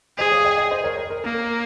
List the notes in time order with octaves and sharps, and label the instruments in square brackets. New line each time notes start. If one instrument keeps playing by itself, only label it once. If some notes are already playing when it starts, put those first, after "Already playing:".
[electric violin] G#4 [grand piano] C5 D#5
[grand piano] C#5 F5
D#5 G5
D#5 G5
C5 D#5
A#4 C#5
A#4
A#4
[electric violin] A#3 [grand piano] A#4